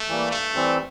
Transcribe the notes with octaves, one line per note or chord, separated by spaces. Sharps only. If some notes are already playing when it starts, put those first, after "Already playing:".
Already playing: A3
E3 G3 A#3
G2 A3
E3 G3 C4